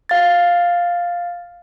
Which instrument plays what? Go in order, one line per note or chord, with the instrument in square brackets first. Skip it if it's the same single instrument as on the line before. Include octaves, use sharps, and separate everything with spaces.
[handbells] F5 A6